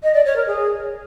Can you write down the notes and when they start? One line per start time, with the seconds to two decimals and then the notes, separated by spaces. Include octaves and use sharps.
0.03 D#5
0.14 D5
0.25 C#5
0.36 A#4
0.47 G#4